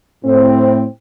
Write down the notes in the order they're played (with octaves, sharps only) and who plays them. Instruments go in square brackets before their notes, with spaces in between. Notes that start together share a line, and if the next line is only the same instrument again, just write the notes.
[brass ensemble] A2 C4